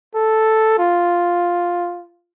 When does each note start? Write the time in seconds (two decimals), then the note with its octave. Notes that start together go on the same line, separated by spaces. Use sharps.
0.15 A4
0.78 F4